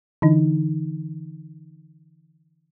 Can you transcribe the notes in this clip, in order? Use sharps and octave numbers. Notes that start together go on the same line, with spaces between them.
D3 E3 D#4